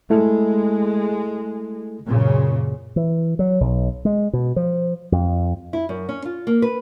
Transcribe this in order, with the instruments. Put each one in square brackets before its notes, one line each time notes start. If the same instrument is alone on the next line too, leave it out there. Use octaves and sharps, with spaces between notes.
[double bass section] G#3 [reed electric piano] A3 E4 A4
[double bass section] F#2 A#2 C#3
[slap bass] E3
F#3
B1
G#3
B2
F3
F2
[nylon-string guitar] E4
F#2
C#4
F4
A#3
B4